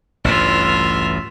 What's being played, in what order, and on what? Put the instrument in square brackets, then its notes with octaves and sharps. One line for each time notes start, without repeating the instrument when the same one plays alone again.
[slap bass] A1 D2 G2 [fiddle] F4 E5